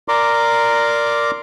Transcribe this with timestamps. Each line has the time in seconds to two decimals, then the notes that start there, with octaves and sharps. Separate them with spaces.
0.08 A#4 D5 A#5 C6 D6